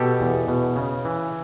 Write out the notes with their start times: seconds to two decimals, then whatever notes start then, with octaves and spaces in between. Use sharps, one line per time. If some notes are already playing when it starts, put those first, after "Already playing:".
Already playing: B2 G4 A4
0.21 E2
0.48 B2
0.76 C#3
1.05 E3